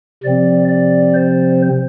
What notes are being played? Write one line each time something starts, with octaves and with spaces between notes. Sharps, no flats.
C3 F3 C4 D5
D5
C5